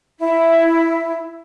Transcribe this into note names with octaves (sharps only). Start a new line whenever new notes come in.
E4